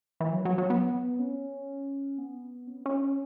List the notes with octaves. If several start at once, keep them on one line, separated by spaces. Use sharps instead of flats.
E3
F#3
F#3
F#3
B3
C#4
B3
C#4
B3
C#4